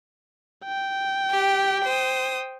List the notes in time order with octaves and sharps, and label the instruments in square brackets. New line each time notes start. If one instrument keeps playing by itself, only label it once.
[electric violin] G5
[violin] G4
C5 D#6